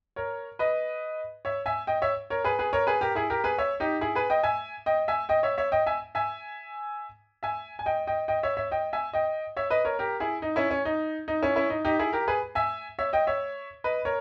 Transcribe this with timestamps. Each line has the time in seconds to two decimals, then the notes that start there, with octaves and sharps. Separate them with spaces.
0.16 A#4 C#5
0.59 B4 D#5
1.45 C#5 E5
1.66 E5 G#5
1.87 D#5 G5
2.02 C#5 E5
2.30 A#4 C#5
2.44 G#4 B4
2.59 G#4 B4
2.73 A#4 C#5
2.87 G#4 B4
3.01 G4 A#4
3.15 E4 G#4
3.30 G4 A#4
3.44 G#4 B4
3.58 C#5 E5
3.80 D#4 G4
4.01 E4 G#4
4.15 G#4 B4
4.30 D#5 G5
4.43 E5 G#5
4.86 D#5 G5
5.08 E5 G#5
5.29 D#5 G5
5.43 C#5 E5
5.58 C#5 E5
5.72 D#5 G5
5.86 E5 G#5
6.15 E5 G#5
7.43 E5 G#5
7.79 G#5
7.86 D#5 G5
8.07 D#5 G5
8.28 D#5 G5
8.43 C#5 E5
8.57 C#5 E5
8.71 D#5 G5
8.93 E5 G#5
9.13 D#5 G5
9.57 C#5 E5
9.70 B4 D#5
9.85 A#4 C#5
9.99 G4 A#4
10.20 E4 G#4
10.42 D#4
10.56 C#4 E4
10.71 C#4
10.85 D#4
11.28 D#4
11.43 C#4 E4
11.56 C#4 E4
11.70 D#4
11.85 D#4 G4
11.99 E4 G#4
12.13 G4 A#4
12.28 G#4 B4
12.55 E5 G#5
12.99 C#5 E5
13.13 D#5 G5
13.27 C#5 E5
13.84 B4 D#5
14.05 A#4 C#5